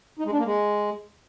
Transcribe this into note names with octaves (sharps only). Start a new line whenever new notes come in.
D#4
G#3
D4
A#3
G#3